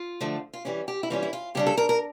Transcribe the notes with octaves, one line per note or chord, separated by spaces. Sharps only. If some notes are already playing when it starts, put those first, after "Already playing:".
Already playing: F4
D3 F3 A3
F4
E3 G3 C#4 G4
G4
E4
E3 G3 C#4 F4
E4
F4
C#3 G3 D4 G4
A4
A#4
A#4